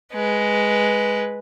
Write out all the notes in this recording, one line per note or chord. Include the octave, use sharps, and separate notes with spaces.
G#3 B4